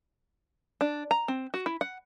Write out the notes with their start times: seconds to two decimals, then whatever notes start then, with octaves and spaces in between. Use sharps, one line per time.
0.81 D4
1.11 A#5
1.28 C4
1.54 F#4
1.66 E4
1.81 F#5